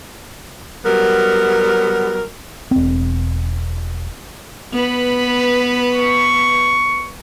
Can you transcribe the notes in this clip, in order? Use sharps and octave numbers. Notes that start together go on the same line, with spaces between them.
F#3 G3 B3 A#4
E1 C4
B3 B4
C#6